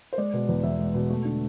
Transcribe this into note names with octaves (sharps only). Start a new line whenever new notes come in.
C5
G#3 D5
B2
E2
E2 E5
G#3
B2
A3
D3